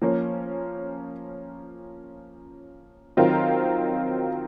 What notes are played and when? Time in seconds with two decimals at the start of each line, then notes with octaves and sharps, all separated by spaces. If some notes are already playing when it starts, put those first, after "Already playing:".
0.02 F3 A#3 C#4
3.17 D#3 F#3 C4 F4 A#4